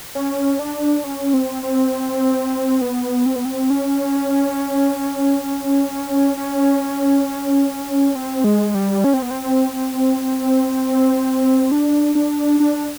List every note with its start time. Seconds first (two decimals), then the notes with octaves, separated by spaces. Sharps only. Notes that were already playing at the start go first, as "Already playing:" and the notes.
0.15 C#4
0.59 D4
1.04 C#4
1.34 C4
1.63 C4
2.81 B3
3.26 C4
3.36 B3
3.45 C4
3.70 C#4
6.37 C#4
8.15 C4
8.44 G#3
8.75 G3
9.04 C#4
9.14 C4
9.22 B3
9.31 C4
11.72 D4
12.15 D4
12.60 D4